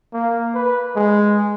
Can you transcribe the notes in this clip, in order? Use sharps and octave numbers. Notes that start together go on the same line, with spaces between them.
A#3
B4
G#3